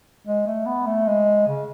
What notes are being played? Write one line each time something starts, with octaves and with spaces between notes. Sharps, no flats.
G#3
A3
B3
A3
G#3
C#3